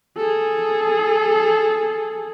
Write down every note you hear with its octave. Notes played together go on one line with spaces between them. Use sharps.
G#4 A4